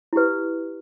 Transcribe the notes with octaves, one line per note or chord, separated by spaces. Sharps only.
E4 G4 B4